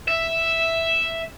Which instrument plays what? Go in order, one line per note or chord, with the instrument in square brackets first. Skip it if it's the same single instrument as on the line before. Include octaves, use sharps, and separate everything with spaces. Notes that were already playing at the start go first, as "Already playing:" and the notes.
[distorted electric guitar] E5